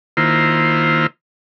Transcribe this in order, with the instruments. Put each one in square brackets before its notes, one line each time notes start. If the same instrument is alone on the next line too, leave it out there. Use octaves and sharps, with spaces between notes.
[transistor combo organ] D#3 A#3 E4 F4 C5